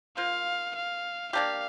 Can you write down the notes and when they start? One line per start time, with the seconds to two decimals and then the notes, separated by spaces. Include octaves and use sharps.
0.17 A#3 F4 C5 F5
0.76 F5
1.33 A#3 D4 G4 F5